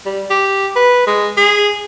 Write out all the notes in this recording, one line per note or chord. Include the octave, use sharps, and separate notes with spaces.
G3
G4
B4
G#3
G#4